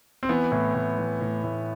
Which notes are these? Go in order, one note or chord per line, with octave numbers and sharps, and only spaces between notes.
C4
E3 B3
A2
A2
E3
A2
A2